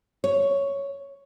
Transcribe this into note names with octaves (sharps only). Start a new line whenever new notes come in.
C#5